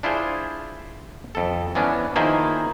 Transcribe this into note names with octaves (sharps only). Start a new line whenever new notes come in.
D4 E4 F4 G#4 C5
F2 A4
E3 B3 C#4 D4
D#3 F3 A#3 E4 G#4 C5